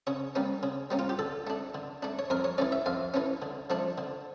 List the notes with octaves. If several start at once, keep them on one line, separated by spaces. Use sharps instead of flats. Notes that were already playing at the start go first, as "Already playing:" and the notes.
C#3 C#5
G3 A#3 C#4
C#3
G3 A#3 C#4
F4
G4
D3 A4
A3 D4
D3
A3 D4
C#5
F2 A#4
C#5
E3 A3 C#4 D5
E5
F2 F5
E3 A3 C#4
D3
F3 A3 D4
D3